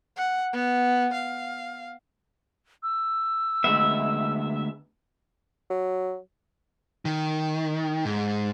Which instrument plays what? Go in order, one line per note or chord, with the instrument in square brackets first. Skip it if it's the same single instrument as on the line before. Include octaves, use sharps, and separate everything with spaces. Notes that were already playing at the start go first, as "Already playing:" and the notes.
[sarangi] F#5
B3
F5
[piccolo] E6
[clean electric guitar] D2 G#3 B3 [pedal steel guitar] E5
[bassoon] F#3
[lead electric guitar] D#3
G#2